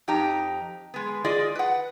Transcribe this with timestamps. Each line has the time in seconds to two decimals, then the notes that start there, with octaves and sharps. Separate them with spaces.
0.08 F2 D#4 G4 A#5
0.94 G#3 B3
1.25 F4 G#4 D5 D#5
1.55 B4 F#5